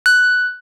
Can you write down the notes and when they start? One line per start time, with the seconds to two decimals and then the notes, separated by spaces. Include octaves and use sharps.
0.06 F#6